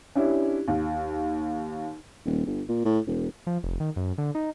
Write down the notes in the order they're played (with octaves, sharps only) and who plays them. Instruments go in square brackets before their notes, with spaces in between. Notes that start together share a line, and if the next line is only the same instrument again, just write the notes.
[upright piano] C#4 D4 E4 G4
D#2
[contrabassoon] D#1
G1
A#2
A2
E1
[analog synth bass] F3
F1
D#3
F#2
D3
D#4